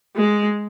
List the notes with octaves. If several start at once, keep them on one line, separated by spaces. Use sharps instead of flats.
G#3